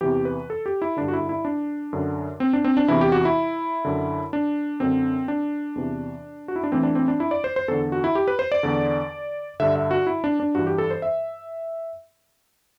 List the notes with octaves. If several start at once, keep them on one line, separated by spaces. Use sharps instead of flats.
E2 C3 E3 G4
B4
A4
G4
E4
G2 D3 D4
F#4
E4
E4
D4
F#2 D3
C4
D4
C4
D4
E2 C3 E3 E4
G4
F#4
E4
F#2 D3
D4
F#2 D3 C4
D4
E2 C3 E3
F#4
E4
D4
A2 E3 C4
D4
C4
D4
E4
D5
C5
C5
E2 D3 A4
F#4
E4
G4
B4
C5
D5
E2 D3
G2 D3 E5
E5
F#4
E4
D4
D4
G2 E3 F#4
G4
A4
C5
E5